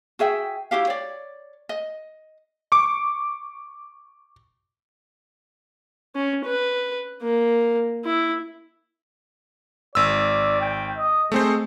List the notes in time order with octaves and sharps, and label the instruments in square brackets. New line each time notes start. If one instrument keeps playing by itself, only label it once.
[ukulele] F#4 G#4 E5 G5
E4 F#4 G4 F5
C#5 D5
D#5
[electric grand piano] C#6 D6
[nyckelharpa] C#4
B4
A#3
E4
[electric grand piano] G#1 E6 [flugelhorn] D5
[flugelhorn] G5
D#5
[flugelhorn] G#3 [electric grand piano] A3 C4 C5